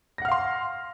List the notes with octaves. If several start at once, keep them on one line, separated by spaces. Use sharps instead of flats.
F5 F#5 C6 F6 A#6